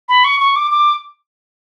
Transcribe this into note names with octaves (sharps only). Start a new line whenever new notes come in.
B5
C#6
C#6
D6
D6